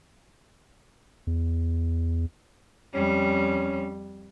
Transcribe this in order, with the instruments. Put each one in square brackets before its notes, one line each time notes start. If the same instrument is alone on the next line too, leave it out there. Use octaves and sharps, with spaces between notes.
[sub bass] E2
[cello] F2 G3 [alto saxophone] C#4